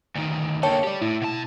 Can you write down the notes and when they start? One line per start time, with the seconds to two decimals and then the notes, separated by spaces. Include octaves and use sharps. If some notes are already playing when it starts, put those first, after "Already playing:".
0.15 D2 D#3
0.63 D3 A#3 C#5 G5 A5
0.84 G4 D5
1.02 A2 E4
1.21 B2 A5